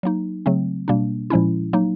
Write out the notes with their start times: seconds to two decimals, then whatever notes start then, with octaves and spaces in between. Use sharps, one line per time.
0.03 F#3 A#3 D#4
0.46 C#3 F#3 A3 C4
0.88 B2 G3 A#3 D4
1.30 A#2 F3 G#3 C#4 E4
1.73 F#3 A#3 D#4